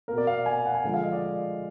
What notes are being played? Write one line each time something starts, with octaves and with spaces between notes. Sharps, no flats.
B2 A#3 A#4
D5
F5
G#5
F#5
G#5
D3 F3 G#3
F5
D#5
D5